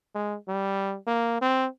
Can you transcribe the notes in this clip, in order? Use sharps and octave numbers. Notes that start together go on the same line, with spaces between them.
G#3
G3
A#3
C4